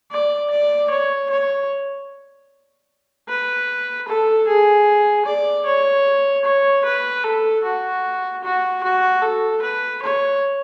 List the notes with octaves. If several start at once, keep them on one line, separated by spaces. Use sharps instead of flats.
D5
D5
C#5
C#5
B4
A4
G#4
D5
C#5
C#5
B4
A4
F#4
F#4
F#4
A4
B4
C#5